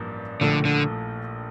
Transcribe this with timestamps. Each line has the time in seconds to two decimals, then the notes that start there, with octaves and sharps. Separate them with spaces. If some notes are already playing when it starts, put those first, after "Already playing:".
Already playing: A1 G2 F3 A#3
0.41 A#1 A2 D3 F3 A3
0.65 D3